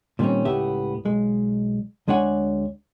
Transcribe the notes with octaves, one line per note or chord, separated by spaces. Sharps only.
A#2 D#3 G3 A#3 C4 C#4
C#2 A2 B3 G4 E5
B1 G#3
D2 G#3 D4 C#5 F#5 G#5